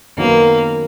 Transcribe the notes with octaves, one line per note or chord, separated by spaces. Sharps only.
F#2 D#3 F#3 A#3 B3